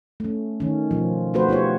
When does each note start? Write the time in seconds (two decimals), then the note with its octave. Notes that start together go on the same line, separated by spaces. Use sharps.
0.20 A3 C#4
0.60 D#3 C#4
0.91 B2 F3
1.34 A3 C4 F#4 B4 C5
1.48 B3 F4 G4 C#5